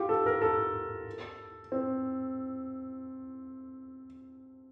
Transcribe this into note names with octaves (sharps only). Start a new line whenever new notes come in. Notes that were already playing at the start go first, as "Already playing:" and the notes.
Already playing: F4 G4
A4
A#4
A4
C4